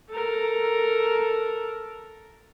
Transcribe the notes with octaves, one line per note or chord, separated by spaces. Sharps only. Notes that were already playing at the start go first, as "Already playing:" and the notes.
A4 A#4